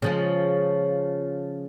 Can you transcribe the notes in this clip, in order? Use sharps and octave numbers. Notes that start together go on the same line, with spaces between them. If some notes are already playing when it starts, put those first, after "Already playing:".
C#3 F3 G#3